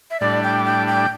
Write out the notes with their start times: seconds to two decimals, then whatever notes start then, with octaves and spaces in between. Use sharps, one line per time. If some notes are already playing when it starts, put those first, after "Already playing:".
0.11 E5
0.20 A2 G3 D4 D5
0.43 G5
0.65 G5
0.88 G5